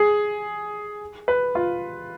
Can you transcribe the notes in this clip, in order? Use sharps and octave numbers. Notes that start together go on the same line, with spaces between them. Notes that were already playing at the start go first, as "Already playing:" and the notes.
Already playing: G#4
B4
F4